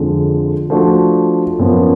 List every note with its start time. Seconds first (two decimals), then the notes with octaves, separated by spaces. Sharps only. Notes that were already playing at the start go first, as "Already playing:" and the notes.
Already playing: F2 D3 F3 G#3
0.70 F3 A3 D4 F#4
1.59 F#2 F3 B3